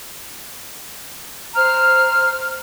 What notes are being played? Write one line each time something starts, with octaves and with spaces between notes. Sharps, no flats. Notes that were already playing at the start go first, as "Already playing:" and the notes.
C5 A#5 F6